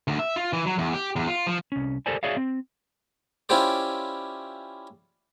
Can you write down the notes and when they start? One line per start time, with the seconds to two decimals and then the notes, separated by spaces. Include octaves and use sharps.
0.08 D2
0.19 E5
0.36 F4
0.53 E3
0.67 F#3
0.78 E2
0.94 G4
1.16 E2
1.28 F4
1.47 F3
1.72 C2 C#4
2.06 G4 A4 A#4 C5 D5 G#5
2.23 F#4 G#4 C#5 D5 E5 F5
2.37 C4
3.49 C#4 E4 F4 G4 C5 D5